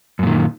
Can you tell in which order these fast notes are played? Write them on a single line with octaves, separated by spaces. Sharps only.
F#2 A#2 D#3